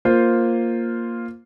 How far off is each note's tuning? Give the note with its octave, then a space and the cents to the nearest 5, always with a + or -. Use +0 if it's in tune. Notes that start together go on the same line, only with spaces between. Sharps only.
A#3 +0 F4 +0 C5 +0